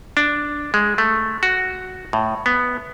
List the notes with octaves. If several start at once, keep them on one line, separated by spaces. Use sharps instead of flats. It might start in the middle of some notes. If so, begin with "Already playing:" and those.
D4
G#3
A3
F#4
A2
B3